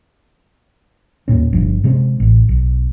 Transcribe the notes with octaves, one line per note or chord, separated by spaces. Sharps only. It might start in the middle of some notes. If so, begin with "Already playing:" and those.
D#2 A#2 C#4
G1 G2 F3
C3 G#3 B3 C4
A1
B1